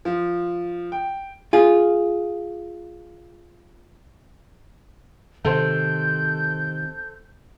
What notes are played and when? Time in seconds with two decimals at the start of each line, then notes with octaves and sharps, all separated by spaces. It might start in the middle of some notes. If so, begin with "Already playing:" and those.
0.05 F3
0.92 G5
1.53 F4 G#4
5.45 C3 D#3 A4 C5 G6